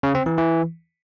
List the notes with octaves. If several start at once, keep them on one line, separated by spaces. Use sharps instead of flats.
C#3
C4
E3
E3